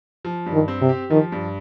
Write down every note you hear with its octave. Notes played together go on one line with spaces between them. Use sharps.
F3
G2
D#3
C4
C3
G4
D#3 F3
G2